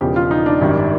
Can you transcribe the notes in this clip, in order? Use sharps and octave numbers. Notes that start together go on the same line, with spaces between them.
E1 E2 C#3 F3 G4
F4
D#4
D4
G#1 F#2 D#3 G3